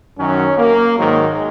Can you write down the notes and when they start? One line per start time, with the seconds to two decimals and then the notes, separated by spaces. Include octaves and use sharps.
0.18 F#2 D#3 F#3 C#4
0.58 A#3
0.98 G#2 D#3 F#3 G#3